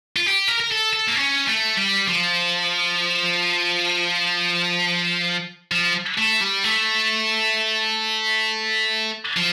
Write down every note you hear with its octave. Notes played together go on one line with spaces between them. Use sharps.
F4
G4
A#4
A#4
A4
A4
A#3
C#4
A3
G3
F3
F3
A3
G3
A3
F3